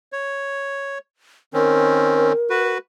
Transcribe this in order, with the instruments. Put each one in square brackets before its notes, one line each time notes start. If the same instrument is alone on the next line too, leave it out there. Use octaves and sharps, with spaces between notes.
[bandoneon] C#5
[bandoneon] D#3 C4 C#4 [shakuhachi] A#4
[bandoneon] F#4 B4